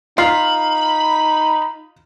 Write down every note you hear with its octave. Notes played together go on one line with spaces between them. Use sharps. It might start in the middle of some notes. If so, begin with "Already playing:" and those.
D#4 F4 B5 F6 C7